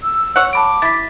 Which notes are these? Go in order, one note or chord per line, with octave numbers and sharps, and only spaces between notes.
E6
C#5 F#5 E6
A5 B5 D6 D7
E4 A6 B6